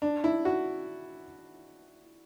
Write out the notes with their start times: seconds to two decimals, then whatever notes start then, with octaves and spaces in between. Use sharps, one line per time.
0.02 D4
0.24 E4
0.45 F#4